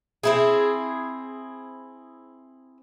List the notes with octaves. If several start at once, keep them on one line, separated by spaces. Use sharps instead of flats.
C4 E4 G#4